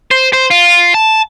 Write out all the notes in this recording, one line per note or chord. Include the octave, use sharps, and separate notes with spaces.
C5
C5
F4
A5